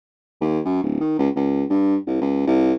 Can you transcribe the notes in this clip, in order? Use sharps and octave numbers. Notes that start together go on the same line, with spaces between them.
D#2
F#2
D1
D#3
C#2
C#2
G2
C2
C#2
C2